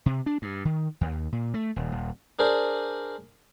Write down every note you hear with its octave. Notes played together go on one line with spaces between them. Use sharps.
C3
D4
G2
D#3
D#2
A#2
A3
D#1
D#1
D4 G#4 A#4 C5 D5